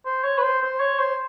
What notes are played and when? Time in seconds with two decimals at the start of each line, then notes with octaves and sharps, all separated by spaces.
0.05 C5
0.24 C#5
0.38 B4
0.42 C5
0.62 C5
0.80 C#5
0.99 C5